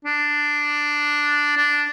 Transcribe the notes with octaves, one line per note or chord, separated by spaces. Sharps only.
D4
D4